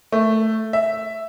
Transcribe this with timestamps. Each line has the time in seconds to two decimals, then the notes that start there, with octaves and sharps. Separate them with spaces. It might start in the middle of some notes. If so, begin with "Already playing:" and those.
0.12 A3
0.73 E5